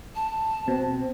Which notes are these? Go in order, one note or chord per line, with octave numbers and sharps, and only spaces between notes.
A5
B2 C4